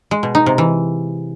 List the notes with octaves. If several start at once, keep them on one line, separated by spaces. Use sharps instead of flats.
G#3
B2
D#4
C3
E3